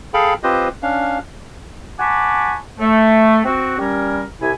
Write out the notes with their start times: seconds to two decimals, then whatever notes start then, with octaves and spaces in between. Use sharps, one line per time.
0.14 G#4 A4 F5 G5 B5
0.43 C4 F4 G4 B4 C5 D#5
0.83 C#4 D4 F5
1.99 F#5 G#5 A5 B5 C#6 D6
2.79 A3
3.44 C4 F#4
3.78 G3 C#4 A#4
4.41 C2 C3 E4 G#5